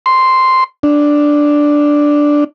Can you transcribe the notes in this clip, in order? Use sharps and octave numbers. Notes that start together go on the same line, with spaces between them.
C6
D4